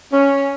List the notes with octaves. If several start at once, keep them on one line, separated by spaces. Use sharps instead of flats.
C#4